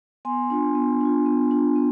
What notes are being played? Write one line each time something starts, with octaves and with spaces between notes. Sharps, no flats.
B3 G#5 C6
D4 F4
B3
D4 F4
B3
D4 F4
B3